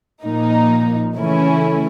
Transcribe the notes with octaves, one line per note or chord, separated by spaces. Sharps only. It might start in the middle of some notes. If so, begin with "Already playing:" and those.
A#2 F3 A#3 D#4
C#3 E3 A3 C#4 E4